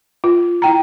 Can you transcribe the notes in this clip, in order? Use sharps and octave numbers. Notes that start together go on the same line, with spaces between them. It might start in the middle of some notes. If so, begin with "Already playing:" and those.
F4
E4 G5 A#5